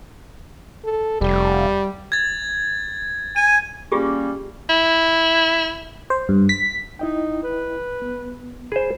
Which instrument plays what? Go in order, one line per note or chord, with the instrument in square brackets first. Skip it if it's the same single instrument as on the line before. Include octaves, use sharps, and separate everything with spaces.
[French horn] A4
[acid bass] F1 [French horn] G3
[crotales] G#6 A6
[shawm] G#5 [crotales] D#7
[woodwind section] G3 A#3 C#4 [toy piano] F4 G4 G#4
[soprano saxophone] E4
[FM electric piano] C5
G2
B6
[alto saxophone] D#4 [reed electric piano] E4 D#5 G5
[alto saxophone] B4
[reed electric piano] B3
[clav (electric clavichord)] G#4 C5 [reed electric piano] G#5 B5